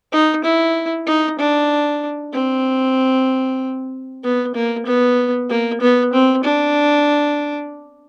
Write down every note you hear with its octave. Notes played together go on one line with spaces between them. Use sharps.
D#4
E4
D#4
D4
C4
B3
A#3
B3
A#3
B3
C4
D4